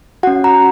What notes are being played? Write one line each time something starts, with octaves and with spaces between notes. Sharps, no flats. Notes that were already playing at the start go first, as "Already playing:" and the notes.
C#4 F#4 F#5
A#5